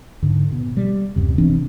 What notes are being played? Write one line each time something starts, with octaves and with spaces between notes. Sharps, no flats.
G#2 D3
B2
G3
D1 F#2 C3
C3 E3 C4 D4